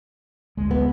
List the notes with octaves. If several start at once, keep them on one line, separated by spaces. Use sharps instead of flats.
D2 G#3
B3